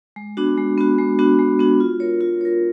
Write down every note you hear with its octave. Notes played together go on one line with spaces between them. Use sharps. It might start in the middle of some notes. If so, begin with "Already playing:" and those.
G#3
B3 D4 F#4
G#3
B3 D4 F#4
G#3
B3 D4 F#4
G#3
B3 D4 F#4
F4
A#4 C#5
F4
A#4 C#5